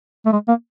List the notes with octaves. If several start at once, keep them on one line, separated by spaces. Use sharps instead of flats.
A3
G#3
A#3